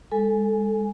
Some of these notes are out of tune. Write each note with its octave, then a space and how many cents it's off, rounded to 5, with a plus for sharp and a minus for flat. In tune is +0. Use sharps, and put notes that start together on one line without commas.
G#3 -35 A4 +0 G#5 +0